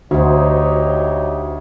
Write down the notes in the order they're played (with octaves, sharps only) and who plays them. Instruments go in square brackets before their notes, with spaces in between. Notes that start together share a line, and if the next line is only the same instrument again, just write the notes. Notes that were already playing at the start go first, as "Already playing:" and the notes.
[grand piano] D2 [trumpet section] D#4 G4 C#5 [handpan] F#4 C5